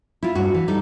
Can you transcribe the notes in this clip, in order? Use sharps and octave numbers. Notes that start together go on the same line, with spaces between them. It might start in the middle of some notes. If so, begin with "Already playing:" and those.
E4 F4
G2 F#4
E3
G3 D#4 A4